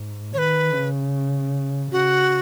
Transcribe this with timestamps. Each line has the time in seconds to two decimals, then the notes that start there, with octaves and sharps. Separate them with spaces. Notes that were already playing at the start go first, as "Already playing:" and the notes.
Already playing: G#2
0.33 D#3 B4 C#5
0.73 C#3
1.91 C#3 F#4